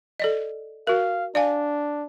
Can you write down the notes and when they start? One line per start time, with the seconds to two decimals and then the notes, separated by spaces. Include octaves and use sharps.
0.20 A4 D5 D#5
0.87 F#4 A#4 F5
1.35 D4 D5 F5 G#5